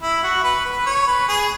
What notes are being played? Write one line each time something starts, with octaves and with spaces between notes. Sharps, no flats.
E4
F#4
B4
B4
C#5
B4
G#4